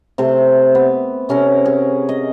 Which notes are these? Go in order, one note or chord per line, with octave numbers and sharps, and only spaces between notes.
C3 A3 C5 A5
B3
C3 C#4 A4 A#4
G#4
D#5